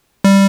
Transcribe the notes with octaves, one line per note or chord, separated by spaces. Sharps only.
G3